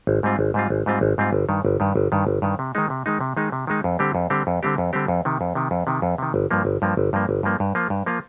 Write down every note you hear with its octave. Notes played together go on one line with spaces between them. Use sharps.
G#1
G#2 G3 C4 F4
G#1
G#2 G3 C4 F4
G#1
G#2 G3 C4 F4
G#1
G#2 G3 C4 F4
G1
G2 D#3
G1
G2 D#3
G1
G2 D#3
G1
G2 D#3
C3
D#3 G#3 D#4
C3
D#3 G#3 D#4
C3
D#3 G#3 D#4
C3
D#3 G#3 D#4
F2
D3 G3 C4 G4
F2
D3 G3 C4 G4
F2
D3 G3 C4 G4
F2
D3 G3 C4 G4
F2
C3 D#3
F2
C3 D#3
F2
C3 D#3
F2
C3 D#3
G1
G2 F3 A#3
G1
G2 F3 A#3
G1
G2 F3 A#3
G1
G2 F3 A#3
G2
F3 A#3 F4
G2
F3 A#3 F4